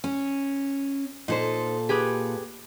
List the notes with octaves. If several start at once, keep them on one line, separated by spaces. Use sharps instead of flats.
C#4
A#2 D#4 A4 C5
G4 G#4 B4